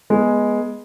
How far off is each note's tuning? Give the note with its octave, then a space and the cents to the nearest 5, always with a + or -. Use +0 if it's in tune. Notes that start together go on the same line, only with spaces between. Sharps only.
G#3 +0 B3 -20